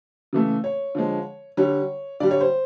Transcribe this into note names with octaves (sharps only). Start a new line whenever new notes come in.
C#3 E3 A3
C#5
D3 F3 G#3
D3 G3 C#5
D3 G3 D5
C#5
C5